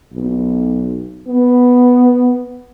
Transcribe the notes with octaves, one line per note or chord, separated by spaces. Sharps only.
B1
B3